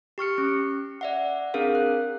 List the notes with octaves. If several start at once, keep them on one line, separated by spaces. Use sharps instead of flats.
G4 C#6 F6 C#7
C#4
D5 E5 F#5
C4 D4 G#4 A#4 F5
F#6